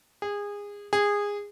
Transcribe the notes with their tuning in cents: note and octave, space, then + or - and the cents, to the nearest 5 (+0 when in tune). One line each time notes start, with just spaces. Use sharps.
G#4 -25
G#4 -20